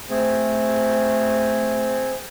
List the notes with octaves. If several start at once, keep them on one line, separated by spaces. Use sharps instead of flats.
A3 C4 G#4